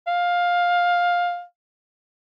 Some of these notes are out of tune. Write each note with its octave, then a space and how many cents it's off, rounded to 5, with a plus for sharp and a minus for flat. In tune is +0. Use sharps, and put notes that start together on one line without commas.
F5 +15